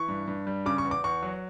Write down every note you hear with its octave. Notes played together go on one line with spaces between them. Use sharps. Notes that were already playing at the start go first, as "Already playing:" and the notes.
Already playing: E3 C#6
G2
G2
G3
C#3 D6
C#6
E2
D6
E2 C#6
F#3